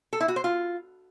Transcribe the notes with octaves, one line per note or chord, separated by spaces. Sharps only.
A4
E4
F#4
C5
F4